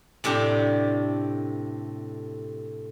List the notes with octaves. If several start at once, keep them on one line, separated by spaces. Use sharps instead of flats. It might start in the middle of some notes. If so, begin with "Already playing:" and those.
A2 C3 D4 G4